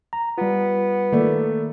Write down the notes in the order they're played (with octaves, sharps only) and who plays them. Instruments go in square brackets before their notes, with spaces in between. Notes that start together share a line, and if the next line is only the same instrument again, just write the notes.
[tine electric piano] A#5
[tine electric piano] G3 F4 [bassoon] B3
[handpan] D#3 A#3 D5 [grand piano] A3